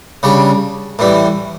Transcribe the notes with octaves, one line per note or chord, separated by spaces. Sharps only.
C#3 G3 D4
A2 E3 G3